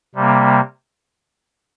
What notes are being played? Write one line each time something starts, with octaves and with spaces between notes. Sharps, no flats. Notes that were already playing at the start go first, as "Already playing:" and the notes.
C3 G3 A#3